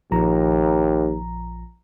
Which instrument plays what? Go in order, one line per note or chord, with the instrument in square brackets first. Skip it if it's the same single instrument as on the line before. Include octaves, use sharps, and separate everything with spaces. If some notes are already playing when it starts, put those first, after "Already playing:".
[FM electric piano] A#1 F3 A#5 [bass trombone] D#2